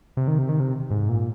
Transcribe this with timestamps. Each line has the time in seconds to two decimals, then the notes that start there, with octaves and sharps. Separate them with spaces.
0.17 C3
0.28 D#3
0.38 C3
0.49 D#3
0.60 C3
0.91 G#2
1.09 A#2